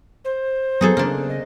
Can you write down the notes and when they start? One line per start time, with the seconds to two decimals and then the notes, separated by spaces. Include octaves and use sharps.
0.24 C5
0.81 F#3 B3 D#4 G#4 A4
0.97 C#3 A#3 D4
1.29 D#5